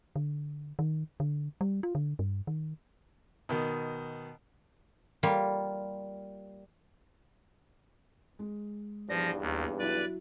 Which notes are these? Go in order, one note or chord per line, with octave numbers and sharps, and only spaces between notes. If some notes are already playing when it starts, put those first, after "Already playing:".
D3
D#3
D3
G3
F4
D3
G2
D#3
B2 D#3
G3 A#3 F4
G#3
B1 E2 G2 F3 D5 A#6
D#2
F#3 E4 B4 D5